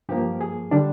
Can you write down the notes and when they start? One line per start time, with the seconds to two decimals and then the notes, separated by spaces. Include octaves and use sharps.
0.09 G2 F3 A#3 G4
0.41 G#4
0.71 D3 G3 D4